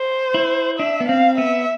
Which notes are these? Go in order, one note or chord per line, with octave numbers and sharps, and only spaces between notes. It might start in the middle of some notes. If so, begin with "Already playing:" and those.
Already playing: C5
E4
D4 E5
B3
C4 F5
B3 E5